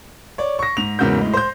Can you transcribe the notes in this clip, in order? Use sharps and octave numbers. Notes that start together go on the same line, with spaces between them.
C#5 D5
C#6 A#6
G#2 F7
E2 G#2 C#3 A#3 F#4 G6
A2 G#3
C5 G6